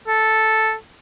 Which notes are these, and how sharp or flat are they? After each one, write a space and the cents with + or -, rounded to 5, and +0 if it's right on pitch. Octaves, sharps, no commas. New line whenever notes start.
A4 -5